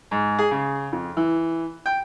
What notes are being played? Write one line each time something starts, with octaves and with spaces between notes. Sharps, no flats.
G#2
G#4
C#3
F2
E3
G5